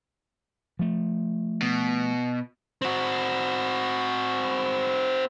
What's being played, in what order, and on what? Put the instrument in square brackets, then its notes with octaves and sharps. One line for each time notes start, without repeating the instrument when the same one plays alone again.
[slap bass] F3 A3
[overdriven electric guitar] B2
[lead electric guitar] C4 F#4